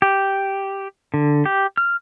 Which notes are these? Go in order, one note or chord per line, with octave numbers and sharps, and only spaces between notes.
G4
D3
G4
F6